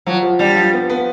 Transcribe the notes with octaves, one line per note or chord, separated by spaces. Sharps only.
F3 F#3
F3
G3 D4
F3
B3
B3